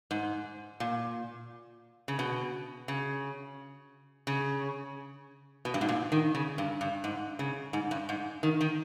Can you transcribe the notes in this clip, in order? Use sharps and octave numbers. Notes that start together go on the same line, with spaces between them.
G#2
A#2
C#3
B2
C#3
C#3
B2
G2
G#2
A#2
D#3
C#3
G2
G2
G#2
C#3
G#2
G2
G#2
D#3
D#3